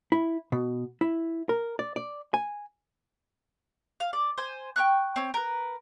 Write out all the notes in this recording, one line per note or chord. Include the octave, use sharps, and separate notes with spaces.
E4
B2
E4
A#4
D5
D5
G#5
F5
D5
C5 G#5
G5 A#5 C#6 F#6
C4 C#5
A#4 B4